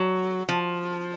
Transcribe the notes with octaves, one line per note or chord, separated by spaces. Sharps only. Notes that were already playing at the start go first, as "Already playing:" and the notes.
Already playing: F#3
F3